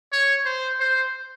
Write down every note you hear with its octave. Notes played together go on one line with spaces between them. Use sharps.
C#5
C5
C5